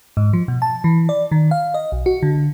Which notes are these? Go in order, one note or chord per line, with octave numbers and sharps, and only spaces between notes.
G#2
F3
B2
A5
E3
D5
D#3
F5
D#5
B1
F#4
D3